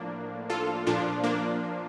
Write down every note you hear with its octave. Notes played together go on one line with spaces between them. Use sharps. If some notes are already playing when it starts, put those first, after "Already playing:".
Already playing: A2 F3 A#3 D4
F4 A4
A#2 F3 D4 F4
A#3 D4